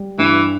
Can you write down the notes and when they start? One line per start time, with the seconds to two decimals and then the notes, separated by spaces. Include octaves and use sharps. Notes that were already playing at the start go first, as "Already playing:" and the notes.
Already playing: G3
0.19 G2 E3